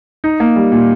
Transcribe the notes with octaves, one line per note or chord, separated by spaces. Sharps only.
D#4
A#3
G3
A#2